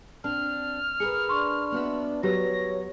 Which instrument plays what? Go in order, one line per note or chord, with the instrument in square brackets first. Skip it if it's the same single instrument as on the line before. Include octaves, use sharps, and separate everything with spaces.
[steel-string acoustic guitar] C4 D4 [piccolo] F6
[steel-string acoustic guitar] G#4 A#4 B4 [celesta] C#7
[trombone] D4 [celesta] C6 C#6
[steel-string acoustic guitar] B3 F#4 E5
[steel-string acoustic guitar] F#3 [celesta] F#4 G4 B4 [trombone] C#5 [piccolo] A#6